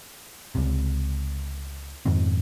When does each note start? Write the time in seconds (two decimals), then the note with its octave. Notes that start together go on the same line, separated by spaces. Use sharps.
0.55 C#2 C3
2.06 F2 G#2 D#3 C4